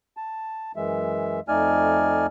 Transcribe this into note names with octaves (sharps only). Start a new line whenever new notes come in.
A5
F#2 E3 G#3 E5
F2 A3 D#4 D5 G#5 F6